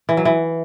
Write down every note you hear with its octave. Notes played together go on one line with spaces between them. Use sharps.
E3
F#3
E3